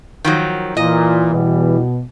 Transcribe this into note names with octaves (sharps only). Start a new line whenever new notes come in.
D#3 F3 F#3
A#2 E3 D#5
E2 B2 G3